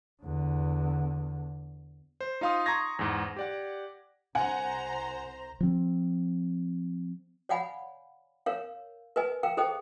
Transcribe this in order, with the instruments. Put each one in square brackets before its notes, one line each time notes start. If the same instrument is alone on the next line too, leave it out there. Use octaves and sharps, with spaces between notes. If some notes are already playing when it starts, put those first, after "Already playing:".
[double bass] E2 D3
[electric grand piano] C5
D#4 F4 F5 C6 D#6
A#5 C6 C#6 D#6 G#6 A#6
E2 G#2
G4 D5 F#5
[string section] C2 C5 A#5 [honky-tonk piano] F#5 G#5
[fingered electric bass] F3 C4
[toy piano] C#5 D5 F5 F#5 G#5 B5
A#4 C#5 F5
A#4 B4 D#5 G#5
A#4 F5 G5
G#4 A4 C5 D#5 G5